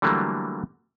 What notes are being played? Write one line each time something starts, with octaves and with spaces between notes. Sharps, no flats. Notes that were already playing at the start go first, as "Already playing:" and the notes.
D3 E3 F#3 G3 A3 A#3